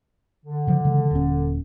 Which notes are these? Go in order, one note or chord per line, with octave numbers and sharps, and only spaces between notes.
D3
C#3 F3
C#3 E3 G#3
D#1 C#4